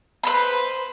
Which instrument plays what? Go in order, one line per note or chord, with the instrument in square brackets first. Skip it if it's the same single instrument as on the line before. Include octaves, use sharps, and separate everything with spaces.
[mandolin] B4 C5 B5